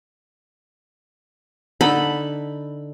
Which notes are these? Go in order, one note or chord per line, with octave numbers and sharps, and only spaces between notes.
D3 D#4 A4 B5